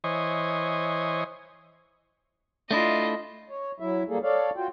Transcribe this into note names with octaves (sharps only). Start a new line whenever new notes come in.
E3 C5 C#5 D#5 G#5
A3 D4 E4 F4 D#5
C#5
F#3 E4 E5
G3 A#3 G#4 A4
A4 C#5 D5 F5
F4 F#4 G5